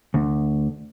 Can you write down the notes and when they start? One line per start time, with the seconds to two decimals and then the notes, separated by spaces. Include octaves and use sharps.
0.14 D2